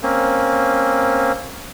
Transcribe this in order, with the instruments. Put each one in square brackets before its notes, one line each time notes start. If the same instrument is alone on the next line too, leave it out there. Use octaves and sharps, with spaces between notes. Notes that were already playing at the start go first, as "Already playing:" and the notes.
[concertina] A#3 C4 C#4